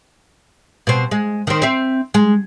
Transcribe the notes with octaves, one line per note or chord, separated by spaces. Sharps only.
B2 C4
G#3
D#3 C4
C4 E5
G#3